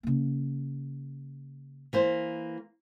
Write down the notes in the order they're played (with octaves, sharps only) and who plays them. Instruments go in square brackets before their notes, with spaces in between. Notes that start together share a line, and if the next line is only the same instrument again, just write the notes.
[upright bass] C#3 A#3
[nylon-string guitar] E3 A#3 C5